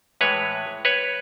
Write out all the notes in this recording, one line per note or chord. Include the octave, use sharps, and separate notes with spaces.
A2 E3 G#3 B4 C#5
B4 C#5